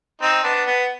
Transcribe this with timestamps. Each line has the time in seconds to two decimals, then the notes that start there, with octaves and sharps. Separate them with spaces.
0.22 C4 D#4
0.43 B3 D4
0.66 B3